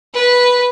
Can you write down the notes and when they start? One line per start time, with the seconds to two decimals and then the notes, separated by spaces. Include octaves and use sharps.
0.14 B4